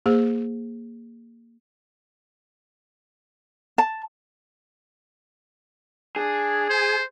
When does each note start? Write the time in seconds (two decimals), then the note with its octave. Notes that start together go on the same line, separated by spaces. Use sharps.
0.06 A#3 G#4 C5
3.78 A5
6.16 D4 G#4
6.69 C5